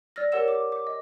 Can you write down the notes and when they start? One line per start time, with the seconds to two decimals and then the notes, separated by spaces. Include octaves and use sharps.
0.16 D5 E6 F6 A#6
0.32 G4 A#4 C#5 F#5 E6 E7
0.48 D6
0.72 D6
0.87 D#5